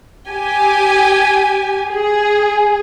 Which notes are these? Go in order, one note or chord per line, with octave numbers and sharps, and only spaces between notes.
G4 G#5
G#4